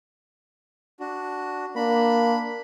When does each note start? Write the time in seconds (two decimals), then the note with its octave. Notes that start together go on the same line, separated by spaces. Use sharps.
1.00 D4 F#4
1.76 A#3 D4 B5